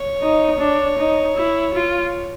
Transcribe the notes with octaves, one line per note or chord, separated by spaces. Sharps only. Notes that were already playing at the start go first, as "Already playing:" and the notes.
Already playing: C#5
D#4
D4
D#4
E4
F4